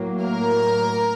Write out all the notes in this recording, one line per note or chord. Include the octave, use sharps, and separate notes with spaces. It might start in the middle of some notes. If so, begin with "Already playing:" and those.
Already playing: A2 F#3 A#3
A#4